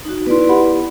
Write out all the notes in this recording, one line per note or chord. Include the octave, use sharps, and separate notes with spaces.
D#4 F#4
B3 E4 B4 D5 C6
G4 F#5 B5